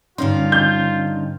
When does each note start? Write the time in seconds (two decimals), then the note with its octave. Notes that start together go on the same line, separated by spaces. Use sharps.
0.18 G2 D3 D#3 C#4 D#4 F4 C6
0.52 G6